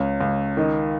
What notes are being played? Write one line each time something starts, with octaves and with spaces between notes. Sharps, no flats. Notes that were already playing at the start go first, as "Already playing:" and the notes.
Already playing: C#2 C#4
C#2
D#3 D#4